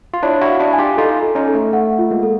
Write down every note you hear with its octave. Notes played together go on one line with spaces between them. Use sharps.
F4
D4 E4 C#5
E4 F#4
F5
D4 E4
G#5
F4 G4
D#4 F4 A4
A4
C#4 D#4
A4
A3
A3 F#5
F4
G#3 A#3
A4